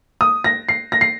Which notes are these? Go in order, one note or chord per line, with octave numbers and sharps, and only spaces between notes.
D#6
A#6
C7
A#6
C7